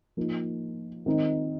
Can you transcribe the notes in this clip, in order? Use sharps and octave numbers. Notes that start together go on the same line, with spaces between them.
F3 A#3 D#4
D#3 C4 D#4